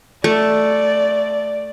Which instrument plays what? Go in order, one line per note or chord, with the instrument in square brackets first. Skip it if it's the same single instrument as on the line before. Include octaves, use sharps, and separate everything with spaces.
[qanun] A3 [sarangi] D5